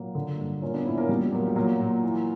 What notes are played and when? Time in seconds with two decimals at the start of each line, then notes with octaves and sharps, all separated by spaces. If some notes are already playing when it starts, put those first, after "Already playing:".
Already playing: A#2 F#3 A#3
0.15 D3
0.38 G2
0.62 A#2 A#3 C#4
0.74 B3 D4
0.85 A#2 C#4 E4
0.98 A#3 C#4
1.09 A#2 G3 B3
1.32 A#2 F#3 A#3
1.47 G3
1.56 A#2 F#3 A#3
1.80 A#2
2.03 E3